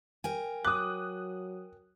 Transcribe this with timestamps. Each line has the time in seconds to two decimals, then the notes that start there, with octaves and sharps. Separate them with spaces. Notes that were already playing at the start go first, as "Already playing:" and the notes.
0.24 A#4 G5 G#5
0.65 F#3 D6 D#6 F#6